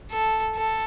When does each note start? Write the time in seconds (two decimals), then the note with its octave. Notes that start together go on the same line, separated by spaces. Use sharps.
0.11 A4
0.56 A4